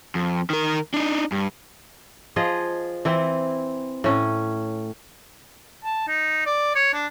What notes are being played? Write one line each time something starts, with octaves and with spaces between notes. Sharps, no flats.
F2
D#3 A#4
D4 D#4
G2
F3 F4 G#4 D#5
E3 C4 E4
A2 C#4
A5
D#4
D5
C#5
D4